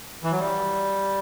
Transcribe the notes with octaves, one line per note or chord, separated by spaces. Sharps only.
E3
F#3
G3